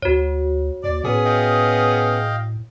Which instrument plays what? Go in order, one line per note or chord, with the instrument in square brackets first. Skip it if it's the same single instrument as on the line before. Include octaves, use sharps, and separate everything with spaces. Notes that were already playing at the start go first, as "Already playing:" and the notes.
[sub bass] D2 [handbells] F#4 C#5
[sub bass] D#2 [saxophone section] D5
[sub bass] A2 [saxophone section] B3 C#4 G#4
[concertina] D#5 F5 G5